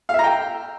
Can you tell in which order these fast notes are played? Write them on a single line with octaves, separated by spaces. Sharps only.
F5 E5 A#5 G5